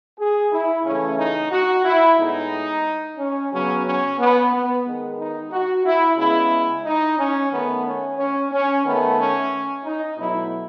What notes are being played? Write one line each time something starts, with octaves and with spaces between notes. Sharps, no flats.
G#4
E4
C#3 E3 A3 C#4
D#4
F#4
E4
A2 G#3 B3 D#4
C#4
C#3 F#3 B3 C#4
C#4
B3
B3
D#3 G#3 B3
D#4
F#4
E4
C#3 G#3 B3 E4
D#4
C#4
D#3 A3 B3
C#4
C#4
C#4
D#3 A3 B3
C#4
D#4
B2 F#3 A3 E4